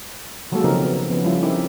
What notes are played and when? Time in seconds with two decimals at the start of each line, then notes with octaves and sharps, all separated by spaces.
0.52 D#3 F#3 G#3 A#3 F#4 A4
0.64 C#3 F3 C4 D#4 G4 A#4
0.84 B3
1.09 F3 B3 C#4
1.24 F3 G3 C#4 E4 F4 A4
1.43 C4 D#4 E4 G4 A#4